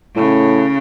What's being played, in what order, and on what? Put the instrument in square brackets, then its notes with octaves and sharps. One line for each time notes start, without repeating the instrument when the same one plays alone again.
[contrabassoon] A2 [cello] C#3